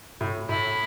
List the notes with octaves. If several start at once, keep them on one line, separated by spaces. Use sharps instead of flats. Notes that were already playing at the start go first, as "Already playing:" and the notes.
A2
A2 E4